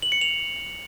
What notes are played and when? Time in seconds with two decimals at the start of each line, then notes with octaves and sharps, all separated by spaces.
0.02 F#7
0.12 C#7
0.21 F7